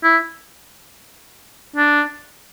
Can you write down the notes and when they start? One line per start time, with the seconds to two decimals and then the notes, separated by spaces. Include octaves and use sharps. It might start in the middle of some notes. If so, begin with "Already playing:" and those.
0.04 E4
1.76 D4